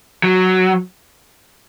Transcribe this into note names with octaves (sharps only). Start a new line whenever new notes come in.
F#3